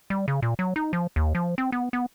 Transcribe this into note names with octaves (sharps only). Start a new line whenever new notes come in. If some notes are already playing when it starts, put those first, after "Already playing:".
G3
C#3
A#2
F#3
D#4
F3
D#2
F3
C4
B3
B3